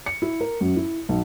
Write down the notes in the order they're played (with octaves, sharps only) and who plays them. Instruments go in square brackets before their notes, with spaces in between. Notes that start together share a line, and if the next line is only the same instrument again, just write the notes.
[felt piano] C#7
E4
A#4
F#2
E4
B1